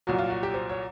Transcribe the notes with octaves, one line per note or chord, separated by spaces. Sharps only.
C2 A#2 F#3 F#4
F4
F#4
G4
C5
C#5